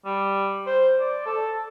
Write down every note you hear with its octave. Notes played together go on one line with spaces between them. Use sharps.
G3
C5
D5
A4